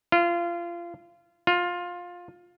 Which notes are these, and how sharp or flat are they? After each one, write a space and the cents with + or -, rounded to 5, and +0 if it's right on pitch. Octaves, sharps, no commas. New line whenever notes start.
F4 -25
F4 +15